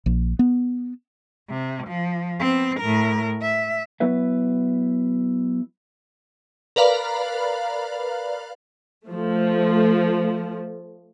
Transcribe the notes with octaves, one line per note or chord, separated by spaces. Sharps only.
A#1
B3
C3
F3
B3 C4
A2 A#4
E5
F#3 B3 E4 B4 E5
A#4 B4 D5 F5 A#5 B5
F3 A3